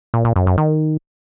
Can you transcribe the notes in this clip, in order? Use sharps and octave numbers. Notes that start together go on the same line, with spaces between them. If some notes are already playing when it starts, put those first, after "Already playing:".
A#2
A#2
F#2
F#2
D#3